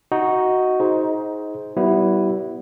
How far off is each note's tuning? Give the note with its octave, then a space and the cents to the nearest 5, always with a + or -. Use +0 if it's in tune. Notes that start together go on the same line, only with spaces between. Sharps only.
D#4 +10 F#4 +0
D#4 +25 G#4 +15 C5 +0
G3 -35 B3 +0 E4 +0